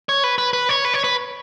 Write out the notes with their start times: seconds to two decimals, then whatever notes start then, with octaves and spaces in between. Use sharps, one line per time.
0.09 C#5
0.24 B4
0.38 B4
0.53 B4
0.69 C#5
0.85 B4
0.94 C#5
1.04 B4